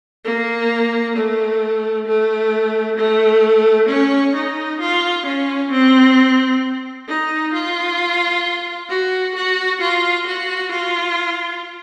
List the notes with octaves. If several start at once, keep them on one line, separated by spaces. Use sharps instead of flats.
A#3
A3
A3
A3
C#4
D#4
F4
C#4
C4
D#4
F4
F#4
F#4
F4
F#4
F4